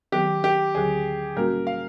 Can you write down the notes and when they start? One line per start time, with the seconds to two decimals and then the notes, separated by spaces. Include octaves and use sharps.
0.12 D#3 F#3 B3 G4
0.44 G4
0.75 D2 D3 F#3 G#4
1.35 A#2 G3 A#3 C#4 F#4 A#4
1.67 F5